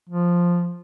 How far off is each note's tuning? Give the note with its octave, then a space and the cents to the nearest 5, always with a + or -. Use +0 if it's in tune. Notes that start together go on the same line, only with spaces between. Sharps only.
F3 +0